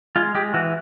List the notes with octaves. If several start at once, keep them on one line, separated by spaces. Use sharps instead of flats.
G#3 F4
G#3 G4
E3 F#4